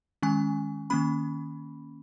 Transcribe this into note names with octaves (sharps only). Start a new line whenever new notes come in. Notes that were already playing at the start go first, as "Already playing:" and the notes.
D#3 G#3 C#4 G#5
D#3 A#3 C#4 B5